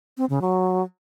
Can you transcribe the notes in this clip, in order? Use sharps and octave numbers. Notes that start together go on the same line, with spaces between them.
C4
C#3
F#3